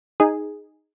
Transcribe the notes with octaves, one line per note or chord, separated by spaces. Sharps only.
D#4 G#4